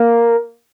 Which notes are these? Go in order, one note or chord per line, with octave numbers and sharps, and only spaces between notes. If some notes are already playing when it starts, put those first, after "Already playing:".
Already playing: A#3